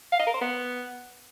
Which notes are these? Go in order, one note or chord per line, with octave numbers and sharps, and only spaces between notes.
F5
D#5
A#4
C5
B3